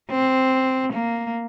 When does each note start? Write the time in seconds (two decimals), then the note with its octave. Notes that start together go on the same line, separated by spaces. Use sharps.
0.11 C4
0.93 A#3